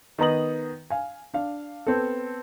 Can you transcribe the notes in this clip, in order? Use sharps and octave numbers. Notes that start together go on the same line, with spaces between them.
D#3 B3 D#4 A#5 D#6 F#7
F5 G#5
D4 F5
B3 C4 A4